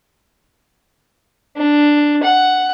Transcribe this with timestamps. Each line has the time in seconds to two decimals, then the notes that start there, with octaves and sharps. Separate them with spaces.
1.57 D4
2.23 F#5